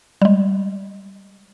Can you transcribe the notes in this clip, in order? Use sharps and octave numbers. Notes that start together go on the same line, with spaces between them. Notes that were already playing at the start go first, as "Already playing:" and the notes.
G3 G#3